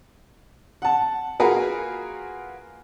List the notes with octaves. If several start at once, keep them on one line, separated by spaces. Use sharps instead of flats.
F#5 A5
A#3 F4 F#4 G#4 A#4 B4